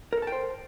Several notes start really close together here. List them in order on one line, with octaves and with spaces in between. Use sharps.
A#4 A4 A5 G5 C5